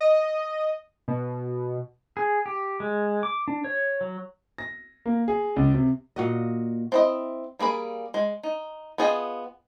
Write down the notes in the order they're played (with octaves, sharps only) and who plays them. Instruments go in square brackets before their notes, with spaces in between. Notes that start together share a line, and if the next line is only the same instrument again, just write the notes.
[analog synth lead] D#5
B2
[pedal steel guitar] G#4
G4
G#3
D6
D4
C#5
F#3
[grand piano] A#6
A#3
G#4
C#2
C3
[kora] A#2 F#4 D#5
[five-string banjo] C4 E4 D#5
G3 A#3 G#4 B5
G#3
D#4
B3 F4 G#4 D#5 G5